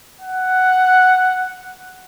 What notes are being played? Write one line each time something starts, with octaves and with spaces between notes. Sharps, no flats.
F#5